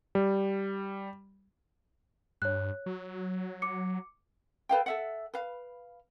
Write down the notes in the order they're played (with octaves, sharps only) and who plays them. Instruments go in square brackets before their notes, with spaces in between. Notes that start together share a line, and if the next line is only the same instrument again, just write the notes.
[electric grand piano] G3
[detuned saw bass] G2 [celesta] C#5 F#6
[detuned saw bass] F#3
[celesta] D6 C#7
[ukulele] A4 B4 F5 G5
A4 E5 F#5
B4 F5